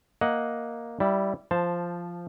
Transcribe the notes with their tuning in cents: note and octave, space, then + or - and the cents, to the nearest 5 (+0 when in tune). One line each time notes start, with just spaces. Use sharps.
A#3 +0 D#5 +10 F#5 +0
G3 -10 E4 +0
F3 -5 C5 +0 A5 +0